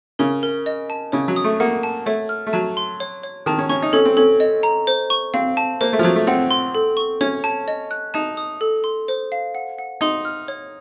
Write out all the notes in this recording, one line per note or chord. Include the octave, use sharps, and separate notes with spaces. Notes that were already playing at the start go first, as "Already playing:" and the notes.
C#3 A#4
A#4
D#5
A5
C#3 C#5
F#3
D#6
A3
A#3 F#5
A5
A3 C#5
F6
A3
F#3 A5
C6
C#5
C#5
D#3 A5
C#4
C#4 C#6
D#4
C#4 A4
C4
C#4 A4
D#5
A#5
C5
C#6
C4 F5
A5
A#3 C5
A3
F3
F#3 C5
A3
C4 F#5
C6
A4
C#6
C#4 C#5
A5
D#5
F#6
D#4 A5
D#6
A4
C6
C5
F5
F#5
F#5
D#4 C6
F6
C#5